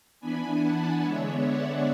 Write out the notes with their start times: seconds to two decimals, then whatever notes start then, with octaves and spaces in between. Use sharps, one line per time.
0.20 E3 B3 D4 G#5 B5
0.61 F#5 A5
1.02 D3 G#3 B3 D4 C#5 E5
1.43 D5 F#5